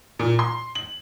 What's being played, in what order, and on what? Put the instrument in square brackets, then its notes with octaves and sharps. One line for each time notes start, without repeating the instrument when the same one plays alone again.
[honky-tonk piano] A#2
C6
F#7